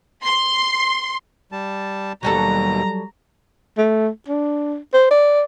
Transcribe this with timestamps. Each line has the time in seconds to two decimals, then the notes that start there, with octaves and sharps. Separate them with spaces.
0.24 C6
1.52 G3 A5
2.23 D#2 B2 F#3 G3 A4 A#5
3.77 A3
4.28 D4
4.94 C5
5.11 D5